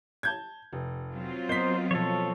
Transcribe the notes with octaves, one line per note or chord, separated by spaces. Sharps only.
A5 G6 G#6
F1
F#3 C4 F4
B3 A#4 C5 D#5 B6 G7
B2 F3 A4 C#5